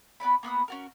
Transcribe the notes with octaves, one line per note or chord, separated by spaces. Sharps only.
B3 B4 D5 B5
A#3 B3 B4 D#6
C#4 F#4 A#4